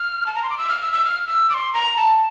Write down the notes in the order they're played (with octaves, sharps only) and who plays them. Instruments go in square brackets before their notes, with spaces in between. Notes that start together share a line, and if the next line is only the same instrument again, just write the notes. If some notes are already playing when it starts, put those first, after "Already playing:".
Already playing: [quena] F6
A5
A#5
C6
D6
E6
F6
E6
E6
F6
E6
D6
C6
A#5
A5